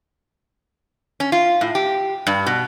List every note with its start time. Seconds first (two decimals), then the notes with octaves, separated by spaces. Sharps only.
1.20 C#4
1.32 F4
1.61 A2
1.75 G4
2.27 G2
2.46 B2